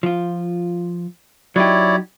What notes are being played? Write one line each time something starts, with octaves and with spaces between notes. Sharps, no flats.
F3 F4
F#3 D#4 E4 G4 C#5 D5